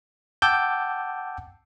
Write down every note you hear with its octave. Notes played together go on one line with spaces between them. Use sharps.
F#5 G5 A5 D6 E6 G6